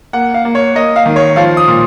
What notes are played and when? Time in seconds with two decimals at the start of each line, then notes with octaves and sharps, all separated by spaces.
0.13 A#3 F#5
0.34 F5
0.45 A#3
0.55 C#5
0.75 A#3 D#5
0.96 F5
1.06 D#3
1.16 C#5
1.36 F3 F5
1.57 D#6
1.68 A#2